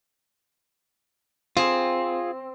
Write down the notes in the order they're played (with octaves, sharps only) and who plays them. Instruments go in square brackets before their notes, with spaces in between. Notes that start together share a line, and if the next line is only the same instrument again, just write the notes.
[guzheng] C4 [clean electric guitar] F4 G#4